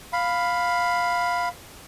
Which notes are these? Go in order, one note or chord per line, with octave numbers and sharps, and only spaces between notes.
F5 B5